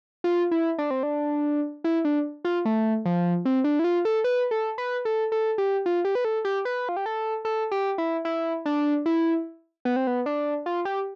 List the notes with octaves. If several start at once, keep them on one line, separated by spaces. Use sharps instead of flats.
F4
E4
D4
C4
D4
E4
D4
F4
A3
F3
C4
D4
E4
F4
A4
B4
A4
B4
A4
A4
G4
F4
G4
B4
A4
G4
B4
F4
G4
A4
A4
G4
E4
E4
D4
E4
B3
C4
B3
D4
F4
G4